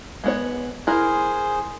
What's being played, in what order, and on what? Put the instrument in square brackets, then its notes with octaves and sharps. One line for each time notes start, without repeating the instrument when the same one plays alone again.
[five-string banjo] G#3 B3 C#5
[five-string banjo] E4 A#4 [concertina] G#4 C5